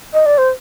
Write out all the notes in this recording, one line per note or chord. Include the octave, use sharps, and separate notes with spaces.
D#5
D5
C5